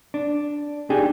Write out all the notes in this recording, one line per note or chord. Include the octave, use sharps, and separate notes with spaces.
D4
D4 D#4 G4 G#4